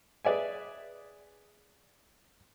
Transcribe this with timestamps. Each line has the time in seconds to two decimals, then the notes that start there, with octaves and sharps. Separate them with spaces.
0.25 G#4 B4 D5 E5 G#5